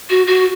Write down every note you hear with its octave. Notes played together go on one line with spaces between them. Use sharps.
F#4
F#4